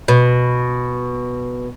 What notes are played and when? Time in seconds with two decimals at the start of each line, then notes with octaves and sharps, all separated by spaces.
0.08 B2